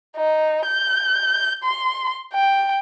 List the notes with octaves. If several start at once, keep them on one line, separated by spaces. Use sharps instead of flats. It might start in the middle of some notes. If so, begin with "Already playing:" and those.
D#4
G6
C6
G5